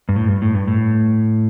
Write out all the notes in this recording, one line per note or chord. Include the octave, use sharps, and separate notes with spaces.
G2
A2
G2
A2
G2
A2